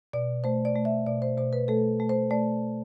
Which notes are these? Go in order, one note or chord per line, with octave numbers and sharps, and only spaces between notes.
B2 D5
A3 C5
D5
A3
E5
B2 D5
C5
B2 C5
B4
A3 A4
A3
C5
A3 D5